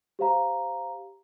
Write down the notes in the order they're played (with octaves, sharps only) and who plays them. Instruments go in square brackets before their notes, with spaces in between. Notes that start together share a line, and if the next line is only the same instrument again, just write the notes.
[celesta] G4 C5 F5 A#5